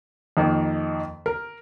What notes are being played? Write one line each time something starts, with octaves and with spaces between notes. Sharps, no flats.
F2 D#3 A#3
A#4